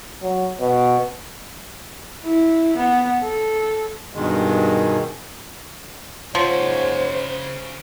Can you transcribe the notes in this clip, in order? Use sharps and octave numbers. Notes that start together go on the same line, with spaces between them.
F#3
B2
E4
B3
A4
G2 B2 D#3 G#3
G#2 C#3 F3 C5 C#5 F#5